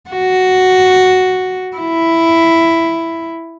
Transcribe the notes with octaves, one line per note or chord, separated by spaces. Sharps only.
F#4
E4